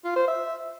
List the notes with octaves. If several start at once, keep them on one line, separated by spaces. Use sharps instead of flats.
F4
C5
E5